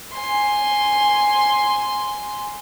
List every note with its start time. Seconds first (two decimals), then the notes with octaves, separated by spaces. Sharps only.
0.13 G#5 C6